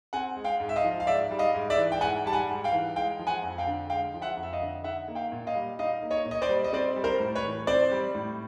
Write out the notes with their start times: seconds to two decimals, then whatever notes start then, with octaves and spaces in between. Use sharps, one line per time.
0.13 C4 F#5 G#5
0.36 G#3
0.44 F5 G5
0.60 G#2
0.69 E5
0.76 D#5 F5
0.84 F3
1.00 F5
1.07 G#2 D5 E5
1.31 G3
1.39 D#5 F5
1.55 G#2
1.70 D5 E5
1.78 E3
1.92 G5
2.01 G#2 F#5 G#5
2.26 G3 A5
2.32 F#5 G#5
2.49 G#2
2.64 F5 G5
2.72 E3
2.96 G#3 F5 G5
3.19 F3
3.27 F#5 G#5
3.43 F2
3.58 F5 G5
3.67 D3
3.90 G#3 F5 G5
4.14 F3
4.22 E5 F#5
4.37 F2
4.43 E5
4.53 D#5 F5
4.62 D3
4.84 D#4 E5 F#5
5.08 A#3
5.15 F5 G5
5.32 A#2
5.47 D#5 F5
5.55 G3
5.79 D#4 D#5 F5
6.03 A#3
6.11 C#5 D#5
6.25 A#2
6.31 D#5
6.42 C5 D5
6.49 G3
6.64 D#5
6.73 C4 C5 D5
6.96 G3
7.04 A#4 C5
7.20 A2
7.35 B4 C#5
7.44 E3
7.67 C4 C5 D5
7.92 G3
8.15 A2